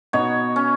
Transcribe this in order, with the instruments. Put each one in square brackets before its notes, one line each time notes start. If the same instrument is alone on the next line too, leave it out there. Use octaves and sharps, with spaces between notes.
[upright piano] B2 B3 D#4 F#4 [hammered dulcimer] C#5
[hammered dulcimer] C#4